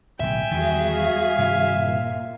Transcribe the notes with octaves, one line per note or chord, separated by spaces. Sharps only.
D1 B1 E5 G5 G#5
E2 D#3 G3 F#4 G#4
F5 G#5
G2 C3 D#3
A#2